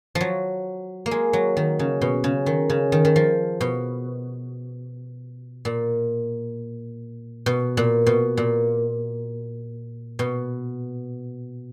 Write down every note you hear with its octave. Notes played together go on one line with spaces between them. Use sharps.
F3
F#3
A#3
G#3
F#3
D#3
C#3
B2
C#3
D#3
C#3
D#3
D#3
F3
B2
A#2
B2
A#2
B2
A#2
B2